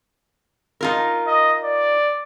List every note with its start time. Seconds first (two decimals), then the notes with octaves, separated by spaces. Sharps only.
0.81 D#4 F4 A#4
1.27 D#5
1.64 D5